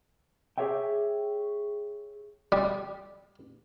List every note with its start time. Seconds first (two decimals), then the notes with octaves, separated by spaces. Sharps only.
0.58 G4 G#4 C#5 E5 G5
2.52 G3